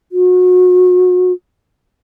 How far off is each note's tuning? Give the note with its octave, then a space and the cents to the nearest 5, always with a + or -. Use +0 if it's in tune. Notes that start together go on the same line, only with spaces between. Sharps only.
F#4 -30